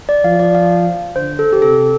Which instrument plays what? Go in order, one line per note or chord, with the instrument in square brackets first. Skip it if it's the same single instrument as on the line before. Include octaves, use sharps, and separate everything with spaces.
[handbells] D5
[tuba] F3 [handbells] F5
[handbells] D5
F5
[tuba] D3 [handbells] C5
[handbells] A4
G4
[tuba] C3 [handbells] A4